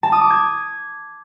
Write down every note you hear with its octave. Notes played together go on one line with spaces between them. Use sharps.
A5
D#6
D6
G#6